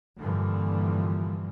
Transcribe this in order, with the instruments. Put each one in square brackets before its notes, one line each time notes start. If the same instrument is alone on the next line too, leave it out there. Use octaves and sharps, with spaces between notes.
[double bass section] G2 A#2 D3 E3 F3 G3